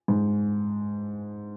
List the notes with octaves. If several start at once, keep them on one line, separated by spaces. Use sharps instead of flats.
G#2